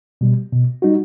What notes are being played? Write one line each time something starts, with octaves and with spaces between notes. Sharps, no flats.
B2 G3
B2
G3 D#4 F#4